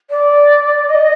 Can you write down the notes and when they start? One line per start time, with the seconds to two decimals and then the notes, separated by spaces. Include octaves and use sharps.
0.10 D5
0.89 D#5